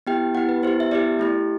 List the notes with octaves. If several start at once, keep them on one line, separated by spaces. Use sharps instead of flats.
B3 E4 G4 G5
B3 E4 G4 F#5
B4
B3 E4 G4 C5
E5
B3 E4 G4 D5
A3 E4 G4